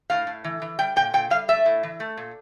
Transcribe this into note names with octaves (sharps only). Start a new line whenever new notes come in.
A2 F5
A2
E3
E3
G3 G5
A#2 G5
A#2 G5
G3 F5
A3 E5
A2
E3
A3
A#2